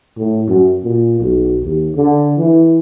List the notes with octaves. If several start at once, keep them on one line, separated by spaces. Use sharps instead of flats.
A2
F#2
A#2
B1
D#2
D3
E3